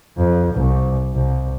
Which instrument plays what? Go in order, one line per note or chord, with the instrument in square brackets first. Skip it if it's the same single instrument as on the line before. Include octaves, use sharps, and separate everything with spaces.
[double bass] F2
C2
C2